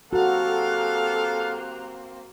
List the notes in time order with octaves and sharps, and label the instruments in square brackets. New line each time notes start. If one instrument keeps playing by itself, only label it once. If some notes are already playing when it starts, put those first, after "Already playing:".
[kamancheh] A#3 C4 [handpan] F#4 [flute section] G4 A#5 F#6 [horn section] A4 F5